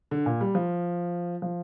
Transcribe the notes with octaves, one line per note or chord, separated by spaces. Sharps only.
D3
A#2
G3
F3
F3